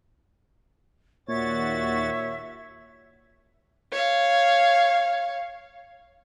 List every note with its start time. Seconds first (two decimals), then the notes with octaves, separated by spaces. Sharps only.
1.29 D#2 A#2 F#4 C#5 E5 A6
3.92 C#5 F5